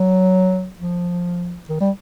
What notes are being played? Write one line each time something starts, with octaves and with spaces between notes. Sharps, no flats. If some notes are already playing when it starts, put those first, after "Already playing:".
Already playing: F#3
F3
D#3
G3